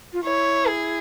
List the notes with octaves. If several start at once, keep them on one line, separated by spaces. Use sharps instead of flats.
F4
E4 C#5
G#4